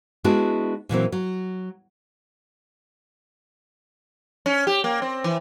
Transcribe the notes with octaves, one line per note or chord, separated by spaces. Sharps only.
G#3 B3 D4 E4 F#4 G#4
A#2 E3 F#3 C4
F#3
C#4
G4
A#3
C4
E3